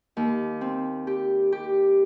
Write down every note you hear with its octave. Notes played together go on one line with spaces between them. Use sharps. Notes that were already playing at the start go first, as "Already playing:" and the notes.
D#2
C4
G4
G4